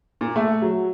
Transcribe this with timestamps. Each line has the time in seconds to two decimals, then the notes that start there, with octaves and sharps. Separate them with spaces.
0.21 A#2
0.36 A3
0.62 F#3